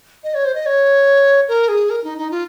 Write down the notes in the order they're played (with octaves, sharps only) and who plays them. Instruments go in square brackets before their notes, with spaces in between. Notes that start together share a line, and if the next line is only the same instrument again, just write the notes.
[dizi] D#5
C#5
C5
D#5
C#5
A#4
G#4
A#4
D#4
D#4
F4